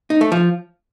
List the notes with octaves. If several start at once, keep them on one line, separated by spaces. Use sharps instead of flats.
D#4
A3
F3